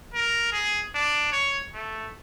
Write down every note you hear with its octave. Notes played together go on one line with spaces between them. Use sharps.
A#4
G#4
D4
C#5
A3